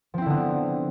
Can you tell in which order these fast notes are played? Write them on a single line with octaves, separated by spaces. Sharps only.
F3 C4 E4 D3 B3